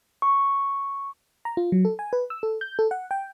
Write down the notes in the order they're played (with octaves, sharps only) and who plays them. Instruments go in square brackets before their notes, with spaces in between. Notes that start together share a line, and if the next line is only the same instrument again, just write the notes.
[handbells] C#6
[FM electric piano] A#5
F4
F#3
A4
G#5
B4
E6
A4
G6
A4
F#5
G5